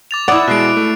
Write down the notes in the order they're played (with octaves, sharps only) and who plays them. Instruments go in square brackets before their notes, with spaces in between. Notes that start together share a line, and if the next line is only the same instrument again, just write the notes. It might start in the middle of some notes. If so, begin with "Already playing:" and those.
[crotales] D6 A6 F7
[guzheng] E4 D5 [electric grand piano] F#5 D#6
[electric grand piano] B2 G#3 [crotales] F#6 C7 D7
[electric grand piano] A3